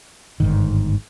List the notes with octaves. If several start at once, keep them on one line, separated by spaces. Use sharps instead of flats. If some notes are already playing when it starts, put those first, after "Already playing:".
G1 G#2 D#3